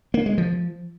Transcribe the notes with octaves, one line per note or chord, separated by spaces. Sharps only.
A#3
G#3
F3